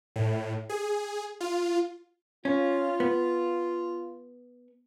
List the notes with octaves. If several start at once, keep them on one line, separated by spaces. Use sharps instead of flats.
A2
G#4
F4
C#4 F4
B3